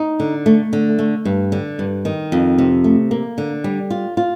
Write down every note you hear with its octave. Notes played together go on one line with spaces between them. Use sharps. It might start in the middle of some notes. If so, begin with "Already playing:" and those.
Already playing: D#4
D3
A3
D3
A3
G2
D3
G2
D#3
F2
C3
A3
A#3
D3
G3
F4
F4